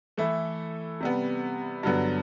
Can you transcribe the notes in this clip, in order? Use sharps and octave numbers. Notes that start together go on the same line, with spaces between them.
E3 A3 E4 A4 E5
C3 G3 B3
G2 D3 F#3 B3